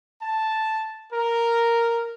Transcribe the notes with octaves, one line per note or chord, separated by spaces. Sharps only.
A5
A#4